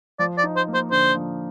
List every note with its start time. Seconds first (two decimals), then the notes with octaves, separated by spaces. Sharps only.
0.19 F3 D5
0.38 D5
0.44 D#4
0.56 C5
0.68 A#3
0.74 C5
0.91 D3 C5
1.15 F3